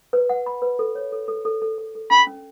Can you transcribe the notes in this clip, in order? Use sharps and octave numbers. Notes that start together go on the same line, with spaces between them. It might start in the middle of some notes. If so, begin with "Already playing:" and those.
B4
F#5
B5
B4
A4
C#5
A4
A4
A4
A4
A4
A4
C#4 B5
C#4